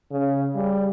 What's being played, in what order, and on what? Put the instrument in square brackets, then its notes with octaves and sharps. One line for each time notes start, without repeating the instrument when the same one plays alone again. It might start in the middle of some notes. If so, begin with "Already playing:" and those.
[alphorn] C#3
G3